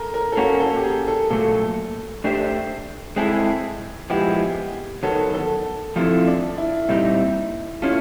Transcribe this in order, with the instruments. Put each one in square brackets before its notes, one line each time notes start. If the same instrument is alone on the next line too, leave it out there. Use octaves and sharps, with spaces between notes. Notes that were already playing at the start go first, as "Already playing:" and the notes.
Already playing: [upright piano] A4 A#4
A#4
A4
[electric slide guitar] A#3 C#4 F#4 [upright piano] A#4
[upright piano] A4
G4
G#4
A4
[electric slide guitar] A#2 F#3 A3 [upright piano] A4
[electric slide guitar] A3 D4 G4 C5 E5
[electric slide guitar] G#3 C4 E4 A4 [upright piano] G#4
[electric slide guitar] F3 G#3 B3 E4 [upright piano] G4
[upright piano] G#4
G4
[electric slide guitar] D#3 F#3 B3 [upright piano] A4
[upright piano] A4
[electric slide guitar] F3 A3 C4 E4 A4 [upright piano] F4
[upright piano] D4
E4
[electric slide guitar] A#2 G3 C4 D#4 [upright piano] E4
[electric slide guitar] A3 C#4 E4 [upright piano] F4